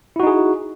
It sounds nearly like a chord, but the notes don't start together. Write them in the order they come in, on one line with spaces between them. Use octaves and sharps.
E4 F#4 D#4 G#4